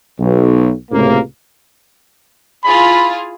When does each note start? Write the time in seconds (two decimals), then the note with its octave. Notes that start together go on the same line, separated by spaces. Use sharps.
0.19 B1
0.91 C#2 A2 C3 A#3
2.64 E4 F4 G#4 B5